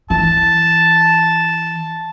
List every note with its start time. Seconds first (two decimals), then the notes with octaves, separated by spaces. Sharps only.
0.10 E3 A5